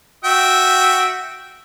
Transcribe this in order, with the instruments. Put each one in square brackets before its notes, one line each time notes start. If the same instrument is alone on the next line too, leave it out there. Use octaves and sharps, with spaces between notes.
[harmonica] F#4 E5 G5